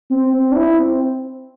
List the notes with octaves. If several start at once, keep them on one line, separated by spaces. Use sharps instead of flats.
C4
C4
D4
E4
C4